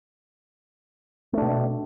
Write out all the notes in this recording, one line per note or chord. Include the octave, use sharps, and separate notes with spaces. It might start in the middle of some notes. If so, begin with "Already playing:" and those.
B2 A3 D4